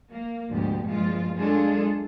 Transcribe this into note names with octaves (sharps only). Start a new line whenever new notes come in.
A#3
D2 G#2 B2 F3 G4
G2 A#2 F3 G#3 F4
F#3 G#3 D4 F4 G#4 A4